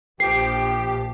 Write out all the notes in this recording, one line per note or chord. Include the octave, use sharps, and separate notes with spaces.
A#1 F3 G4 G5 C7